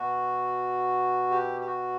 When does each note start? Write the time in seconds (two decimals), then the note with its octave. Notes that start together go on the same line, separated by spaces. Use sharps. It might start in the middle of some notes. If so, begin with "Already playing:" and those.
Already playing: B2 F#4
1.31 G4
1.61 G4
1.67 F#4